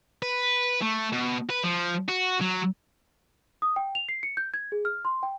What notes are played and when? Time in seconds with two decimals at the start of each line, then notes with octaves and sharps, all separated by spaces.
0.23 B4
0.82 A3
1.13 B2
1.50 B4
1.64 F3
2.09 F#4
2.41 F#3
3.62 D#6
3.76 G5
3.95 F7
4.09 C7
4.23 C#7
4.37 G6
4.54 G#6
4.72 G#4
4.85 F6
5.05 C6
5.23 G5